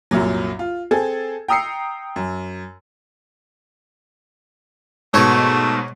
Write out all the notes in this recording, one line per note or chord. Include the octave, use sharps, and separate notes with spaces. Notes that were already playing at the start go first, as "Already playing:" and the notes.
C2 F#2 A#2 F#3
F4
C4 G#4 A4 G#6
G5 A#5 D#6 E6 C7 C#7
F#2
G#2 B2 A3 C#5